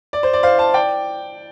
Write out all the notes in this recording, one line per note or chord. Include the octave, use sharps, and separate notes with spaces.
D5
C5
D5
C5 F5
F5 A5
D5 G5